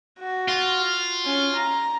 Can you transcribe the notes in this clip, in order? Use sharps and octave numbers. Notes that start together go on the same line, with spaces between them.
F#4
F4
C#4
A#5